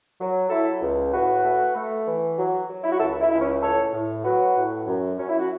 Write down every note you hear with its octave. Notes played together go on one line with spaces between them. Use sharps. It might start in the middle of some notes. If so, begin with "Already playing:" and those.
F#3
F#3 E4 A4
C#2
A2 F#4 B4
A3
A3
E3
F#3
F#3
E4
F#4
C#2 E4 A4
E4
C#2 E4
C#4
A2 A4 C#5
A2
F#3 F#4 B4
A2
F#2
F#2 C#4
E4
F#4